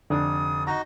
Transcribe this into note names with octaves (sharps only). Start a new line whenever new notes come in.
F1 D3 D4 D#6
D#4 F#4 D#5 A#5